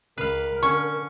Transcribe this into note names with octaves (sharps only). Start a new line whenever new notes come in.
C#2 A#4 B4 F5
D3 C#4 C#6